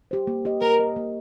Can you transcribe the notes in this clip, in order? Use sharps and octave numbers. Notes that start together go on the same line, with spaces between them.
G4 C5
A#3
G4 D#5
A#3 A#4
G4 D#5
A#3